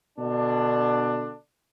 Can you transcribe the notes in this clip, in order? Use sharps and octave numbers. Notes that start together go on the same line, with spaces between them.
B2 D3 D4